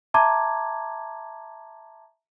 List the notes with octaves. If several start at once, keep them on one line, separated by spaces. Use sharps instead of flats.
E5 A5 A#5 C6 D6 G#6